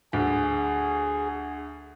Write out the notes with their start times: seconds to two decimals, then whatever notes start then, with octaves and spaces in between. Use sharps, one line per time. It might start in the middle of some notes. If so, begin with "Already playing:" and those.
0.13 D2 G#4